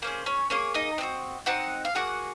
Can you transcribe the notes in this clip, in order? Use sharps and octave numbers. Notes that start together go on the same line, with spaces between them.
A#3 C#4 G#4 C5
C#4 C#5
A#3 C#4 G#4 C#5
D#4 D#5
C4 D#4
F#4
C4 D#4 F#4 F#5
F5
A#3 D#4 F#4 G#4 F#5